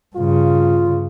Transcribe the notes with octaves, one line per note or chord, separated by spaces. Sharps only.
G2 C#3 F4